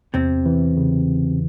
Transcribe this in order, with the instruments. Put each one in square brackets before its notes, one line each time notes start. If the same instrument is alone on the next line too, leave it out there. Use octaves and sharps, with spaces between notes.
[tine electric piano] E2 [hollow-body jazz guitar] C3 C4
[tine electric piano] E3
C#3